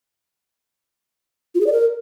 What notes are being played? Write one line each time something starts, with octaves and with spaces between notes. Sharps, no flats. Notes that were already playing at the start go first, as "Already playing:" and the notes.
F4
G#4
D5
A#4